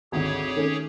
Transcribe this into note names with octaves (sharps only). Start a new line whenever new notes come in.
G#1 D2 G4 G#4 C#5
D#3 A3 C#4